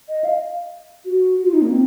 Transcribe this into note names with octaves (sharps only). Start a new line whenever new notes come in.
D#5
F5
F#4
F#4
F4
D#4
A#3
C4